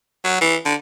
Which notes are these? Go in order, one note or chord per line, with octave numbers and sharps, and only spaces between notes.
F#3
E3
D3